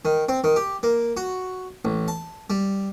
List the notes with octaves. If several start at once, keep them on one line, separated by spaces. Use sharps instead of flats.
D#3
C4
D#3
G4
A#3
F#4
A1
A5
G3